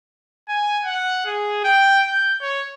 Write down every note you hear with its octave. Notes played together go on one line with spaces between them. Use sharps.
G#5
F#5
G#4
G5
G6
C#5